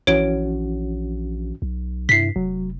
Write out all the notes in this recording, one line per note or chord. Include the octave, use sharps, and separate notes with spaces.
A#1 E3 C#4 F#4 C#5 D7
B1
G2 C3 E4 B6 C7
F1 F#3